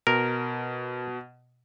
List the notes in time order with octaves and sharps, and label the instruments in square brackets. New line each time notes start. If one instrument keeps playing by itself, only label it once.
[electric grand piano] B2 [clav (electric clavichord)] A#4